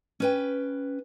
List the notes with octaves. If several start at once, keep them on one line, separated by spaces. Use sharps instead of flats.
C#4 B4 G5